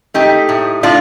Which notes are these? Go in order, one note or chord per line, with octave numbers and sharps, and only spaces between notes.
A3 D#4 G4
A2
A2 D4 F4